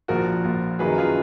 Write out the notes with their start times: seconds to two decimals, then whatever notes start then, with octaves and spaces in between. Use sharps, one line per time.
0.08 A#1 A#2 F3 F#4 A#4
0.44 A#1 A#2 F3
0.79 F#2 D#3 F#3 A#3 G#4 B4
0.98 F4 G#4